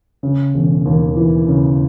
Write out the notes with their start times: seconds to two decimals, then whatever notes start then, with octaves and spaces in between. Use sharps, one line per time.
0.23 C#3
0.54 E1
0.86 D#2
1.16 E3
1.48 C#3